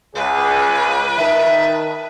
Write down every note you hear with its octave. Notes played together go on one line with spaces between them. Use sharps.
C#2 G#4 B4
D#3 E5 A5